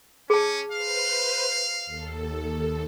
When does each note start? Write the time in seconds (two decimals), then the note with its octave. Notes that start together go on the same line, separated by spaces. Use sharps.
0.30 C#4 G#4 A5
0.72 B4 C5 F5
1.86 D#2 A4